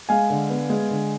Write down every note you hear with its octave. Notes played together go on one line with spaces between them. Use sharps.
G#3 F5 G#5
D3
B3
G#3
D3